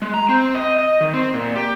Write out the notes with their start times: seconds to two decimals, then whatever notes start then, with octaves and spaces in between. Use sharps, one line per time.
0.02 G#3
0.14 A#5
0.29 C4
0.55 D#5
0.79 D#5
1.01 D#3
1.14 C4
1.34 A#2
1.56 G4